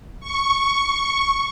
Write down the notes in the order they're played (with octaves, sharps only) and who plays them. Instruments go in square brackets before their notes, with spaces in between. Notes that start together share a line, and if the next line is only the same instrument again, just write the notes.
[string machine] C#6